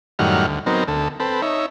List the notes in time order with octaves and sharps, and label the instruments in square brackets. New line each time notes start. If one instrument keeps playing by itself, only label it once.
[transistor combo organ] F#2 A2 D#3 G3 F#5 F6
D2
F#3 B3 C4 D#4 A#4
D2 A4
C4 A4 B4
D#4 C#5 E5